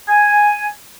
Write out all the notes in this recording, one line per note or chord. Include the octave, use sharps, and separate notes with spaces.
G#5